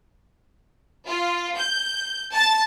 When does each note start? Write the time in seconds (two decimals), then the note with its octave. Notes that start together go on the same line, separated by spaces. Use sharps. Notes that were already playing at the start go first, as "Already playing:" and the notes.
1.06 F4
1.57 G6
2.33 A5 A6